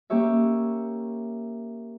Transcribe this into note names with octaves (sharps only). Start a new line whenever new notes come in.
A#3 C#4 G4 C#5 E5